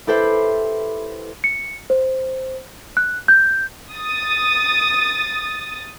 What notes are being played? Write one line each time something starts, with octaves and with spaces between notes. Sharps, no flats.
E4 G4 A4 B4 C5 E5
C#7
C5
F#6
G6
D#6 A6